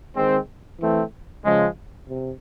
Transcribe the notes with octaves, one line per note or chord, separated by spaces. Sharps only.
D#3 G#3 C4
E3 A3 C4
C#3 F3 G#3
C3